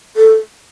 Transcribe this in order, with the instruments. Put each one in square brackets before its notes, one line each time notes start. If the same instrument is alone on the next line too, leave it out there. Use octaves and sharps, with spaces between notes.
[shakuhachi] A4